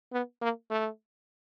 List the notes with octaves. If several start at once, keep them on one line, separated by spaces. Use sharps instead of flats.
B3
A#3
A3